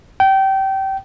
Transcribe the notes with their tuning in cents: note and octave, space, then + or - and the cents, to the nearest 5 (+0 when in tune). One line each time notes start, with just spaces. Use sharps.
G5 -25